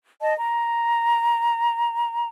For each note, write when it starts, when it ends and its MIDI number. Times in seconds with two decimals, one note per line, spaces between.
0.21 0.34 75
0.21 0.34 81
0.37 2.29 82